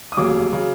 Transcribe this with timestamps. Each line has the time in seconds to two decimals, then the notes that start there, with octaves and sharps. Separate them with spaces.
0.12 D#6
0.17 F1 D#2 C#3 F#3 D6
0.52 C#3 F#3